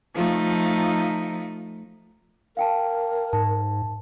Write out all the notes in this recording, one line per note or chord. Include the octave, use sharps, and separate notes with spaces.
F3 A3 D#4
A#4 F5 G5 A5
G#2 A5